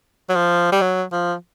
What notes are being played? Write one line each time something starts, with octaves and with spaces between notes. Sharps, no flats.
F#3
F3
G3
F#3
F3